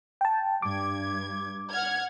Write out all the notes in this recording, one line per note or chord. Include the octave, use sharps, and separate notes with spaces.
G5 A5
G2 D6 G#6
F#5 F6 G#6